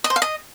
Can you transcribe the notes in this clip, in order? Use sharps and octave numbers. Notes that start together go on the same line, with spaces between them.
D#5
C5
F5
D#5